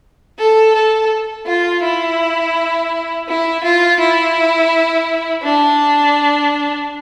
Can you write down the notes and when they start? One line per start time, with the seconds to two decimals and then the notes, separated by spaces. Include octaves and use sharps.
0.39 A4
0.75 A4
1.47 F4
1.84 E4
3.28 E4
3.64 F4
4.00 E4
5.43 D4